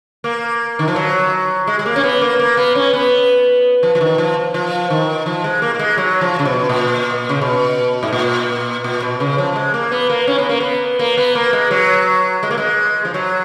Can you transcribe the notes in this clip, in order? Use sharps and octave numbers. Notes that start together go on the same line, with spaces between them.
A#3
D#3
F3
F#3
G#3
G#3
A#3
C#4
B3
A#3
A#3
B3
C#4
B3
F3
F3
D#3
F3
F3
D#3
F3
G#3
A#3
A#3
G#3
F#3
F3
C#3
B2
A#2
C#3
B2
G#2
A#2
A#2
B2
C#3
F3
G#3
A#3
B3
A#3
C#4
B3
A#3
B3
A#3
B3
A#3
G#3
F#3
G#3
A#3
G#3
F3
F#3